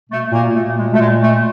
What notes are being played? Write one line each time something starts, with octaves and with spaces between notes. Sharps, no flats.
B2 A3
A#2 A#3
A#2 A3
G#3
A3
A#2 G#3
A3